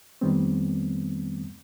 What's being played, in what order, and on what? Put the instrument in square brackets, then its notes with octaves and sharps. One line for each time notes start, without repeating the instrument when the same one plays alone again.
[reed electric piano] F2 D#3 G3 A3 B3 C4